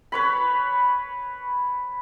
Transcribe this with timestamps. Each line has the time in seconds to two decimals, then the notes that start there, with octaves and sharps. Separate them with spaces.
0.12 B4 C#5 B5